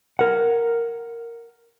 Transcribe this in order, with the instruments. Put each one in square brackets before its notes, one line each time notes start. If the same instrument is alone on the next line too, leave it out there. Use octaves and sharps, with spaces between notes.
[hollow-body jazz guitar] A#4 F#5